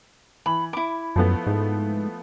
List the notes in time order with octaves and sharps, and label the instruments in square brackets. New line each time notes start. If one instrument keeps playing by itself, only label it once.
[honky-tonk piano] E3 F#7 [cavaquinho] B5
[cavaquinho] E4 D6 [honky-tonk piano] B5
[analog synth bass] F#2 [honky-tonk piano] F3 A3 B3
[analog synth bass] G#2